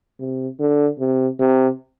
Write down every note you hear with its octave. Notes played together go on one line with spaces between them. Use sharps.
C3
D3
C3
C3